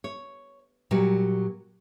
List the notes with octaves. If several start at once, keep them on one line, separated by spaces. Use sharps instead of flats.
C#5
A#2 F#3 G3